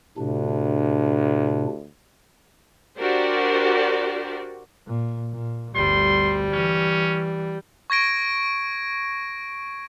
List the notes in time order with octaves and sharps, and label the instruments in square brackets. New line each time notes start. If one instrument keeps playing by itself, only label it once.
[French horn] D2 [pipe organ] A2 C3 D4
[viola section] D4 F#4 G4 A#4 C5 D5
[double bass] A#2
A#2
[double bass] G1 D2 [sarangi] G3 [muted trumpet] C6
[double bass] E3 [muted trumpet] C#4
[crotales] C#6 G#6 A#6 D7